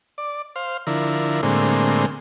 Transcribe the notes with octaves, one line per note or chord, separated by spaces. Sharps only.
D5
C5 F5
D3 F3 E4 A#4
A2 D3 G#3 A#3 C4